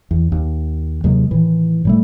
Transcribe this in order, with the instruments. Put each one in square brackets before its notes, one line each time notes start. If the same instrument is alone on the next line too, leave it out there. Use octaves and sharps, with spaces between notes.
[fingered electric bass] E2
D#2
D#2 C3 F#3 G#3
A2 D#3 E3
A2 G3 A3